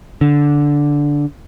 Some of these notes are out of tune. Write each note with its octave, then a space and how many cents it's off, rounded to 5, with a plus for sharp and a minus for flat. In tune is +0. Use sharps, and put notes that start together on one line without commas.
D3 -10